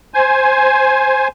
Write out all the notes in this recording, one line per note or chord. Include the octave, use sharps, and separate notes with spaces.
C5 G#5